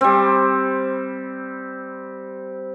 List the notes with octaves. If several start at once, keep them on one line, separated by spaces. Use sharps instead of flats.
G3 C4